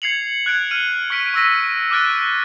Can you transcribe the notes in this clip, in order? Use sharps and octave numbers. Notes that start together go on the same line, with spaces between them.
G#6 C7 C#7 F7 F#7
F#6 G#6 D7
F6 D#7
C#6 F6 B6 D7
C#6 E6 A#6 B6
D6 F6 F#6 A6 D7